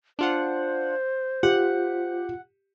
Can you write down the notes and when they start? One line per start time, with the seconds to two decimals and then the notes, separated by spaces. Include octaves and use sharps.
0.19 D4 F4 C5 F#5
1.43 F4 G4 F#5